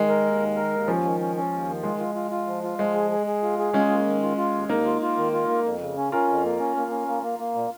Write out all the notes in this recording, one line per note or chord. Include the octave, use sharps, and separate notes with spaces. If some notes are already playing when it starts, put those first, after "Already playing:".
Already playing: D#3 G#3
A#4
D#2
D#3
A#4
D#2
F3 C#4
D#3
C#4
C#4
D#2
D#3
G#3 F4
F4
F4
F4
F3
F4
F3 G#3
G#4
G#4
G#4
F4
G#4
G#3 C#4 F4
A#3
D#3
F4
F4
D#2
D#2 A#3 D#4
F4
F4
D#3
F4
A#3
F2
C#3
C#4
C#4 F4 A#4
F2
A#3
C#4
A#3
C#4
A#3
A#3
A#3
A#2